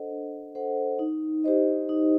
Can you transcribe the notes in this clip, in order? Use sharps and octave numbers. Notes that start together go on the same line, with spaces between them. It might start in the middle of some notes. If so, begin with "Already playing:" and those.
Already playing: D4 A4 C5 D#5 F#5
D4
A4 C5 D#5 F#5
D#4
G4 C5 D#5
D#4